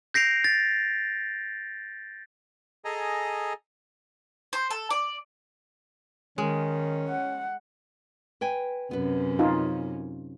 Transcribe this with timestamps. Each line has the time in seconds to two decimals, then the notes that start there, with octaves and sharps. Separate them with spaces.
0.14 G6 A#6 C7 D7 F7
0.44 A6
2.85 G#4 A4 D#5 G#5 A#5
4.53 C5
4.70 A4
4.90 D5
6.38 D#3 G#3 C#4
7.09 F#5
8.41 B4 G5 G#5
8.91 F#2 C3 B3 C#4 B4
9.39 D#4 F4